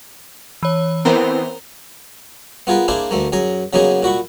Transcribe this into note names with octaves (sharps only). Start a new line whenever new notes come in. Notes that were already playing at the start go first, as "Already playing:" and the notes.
E3 C#5
E3 B3 C4 A#4 C5 A#5
B3 F4 G#4 A#4 B4
A#3 D4 E4 G#4 C5 F5
D2 A3 A#3
F#2 G#4 A#5 D#6
C#3 F#3 A#3 B3 D#4 G#4
A#2 F#4 B5 C#6